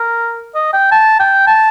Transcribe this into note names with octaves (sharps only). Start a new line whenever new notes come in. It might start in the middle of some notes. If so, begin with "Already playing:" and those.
Already playing: A#4
D#5
G5
A5
G5
A5